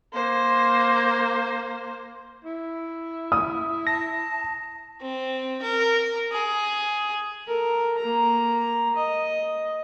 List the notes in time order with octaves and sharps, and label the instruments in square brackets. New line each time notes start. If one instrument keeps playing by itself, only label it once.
[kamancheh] A#3 C5
[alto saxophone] E4
[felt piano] D#6
[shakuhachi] A5 [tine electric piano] A#6
[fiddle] C4
A#4
G#4
[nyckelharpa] A4 A#4
A#3 A#5
D#5